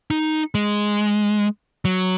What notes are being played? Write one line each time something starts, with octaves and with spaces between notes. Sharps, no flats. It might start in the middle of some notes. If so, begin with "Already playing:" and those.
D#4
G#3
F#3